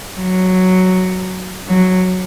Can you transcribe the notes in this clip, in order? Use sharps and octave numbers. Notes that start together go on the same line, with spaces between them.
F#3
F#3